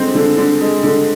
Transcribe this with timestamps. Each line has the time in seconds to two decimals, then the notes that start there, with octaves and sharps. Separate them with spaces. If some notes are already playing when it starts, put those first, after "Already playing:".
Already playing: D3 G#3 C4
0.15 D3
0.37 D3
0.61 G#3
0.83 D3